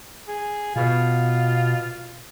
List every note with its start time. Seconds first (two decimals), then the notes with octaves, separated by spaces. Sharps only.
0.28 G#4
0.76 B2 F4